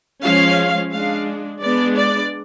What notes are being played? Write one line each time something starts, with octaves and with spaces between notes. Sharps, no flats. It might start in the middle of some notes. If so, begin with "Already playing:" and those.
F3 G#3 C#4 F5
G#3 D4 F5
G#3 B3 D4 D5
D5